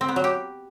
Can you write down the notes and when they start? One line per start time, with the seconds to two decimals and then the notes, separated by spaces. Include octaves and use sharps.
0.01 C4
0.08 B3
0.16 F#3
0.24 G4